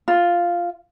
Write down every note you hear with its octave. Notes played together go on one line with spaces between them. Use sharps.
F4